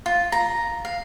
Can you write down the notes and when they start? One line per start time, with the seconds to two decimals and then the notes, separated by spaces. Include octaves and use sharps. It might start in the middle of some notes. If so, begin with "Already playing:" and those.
0.06 F4
0.32 A#5
0.85 F5